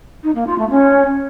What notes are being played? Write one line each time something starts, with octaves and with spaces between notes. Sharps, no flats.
D#4
A#3
F4
A3
C#4